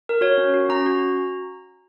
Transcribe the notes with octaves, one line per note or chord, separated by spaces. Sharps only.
A#4
F#4 C#5
C#4
F#4
C#4 A#5
F#4